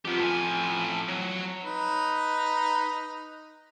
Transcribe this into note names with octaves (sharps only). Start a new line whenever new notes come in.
F2 F3 B3 G4
A2 G#5
F#3
D#4 B4